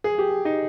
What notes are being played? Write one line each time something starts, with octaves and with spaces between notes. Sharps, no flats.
G#4
G4
D#4